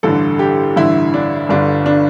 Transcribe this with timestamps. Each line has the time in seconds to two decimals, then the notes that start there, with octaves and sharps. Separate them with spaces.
0.03 A1 G2 D3 A4
0.39 G4
0.76 A1 G2 D3 E4
1.14 D4
1.49 G1 G2 D3 D4
1.86 D4